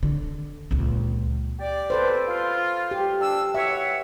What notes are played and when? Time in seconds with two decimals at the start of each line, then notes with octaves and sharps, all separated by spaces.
0.03 D3
0.71 C#2 A#2
1.59 G4 D5
1.90 A4 B4 C5
2.28 F4
2.91 G4
3.20 D4 E6
3.55 F#4 B4 C#5 E5